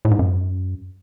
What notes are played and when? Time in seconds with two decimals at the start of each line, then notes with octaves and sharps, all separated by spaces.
0.05 A2
0.11 G#2
0.19 F#2